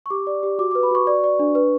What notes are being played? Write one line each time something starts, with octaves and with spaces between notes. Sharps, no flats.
C#6
G4 D6
D5
G4
F#4 D6
B4 D6
B5
F#4 C#6
D5
D5
D4
B4